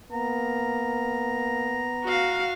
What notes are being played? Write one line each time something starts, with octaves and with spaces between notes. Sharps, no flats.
A#3 B3 A#5
F#4 F5